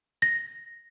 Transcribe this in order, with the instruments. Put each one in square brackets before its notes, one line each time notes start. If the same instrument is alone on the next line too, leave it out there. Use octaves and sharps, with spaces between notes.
[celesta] A#6